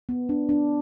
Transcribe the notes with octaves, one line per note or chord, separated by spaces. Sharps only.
B3
D4
D4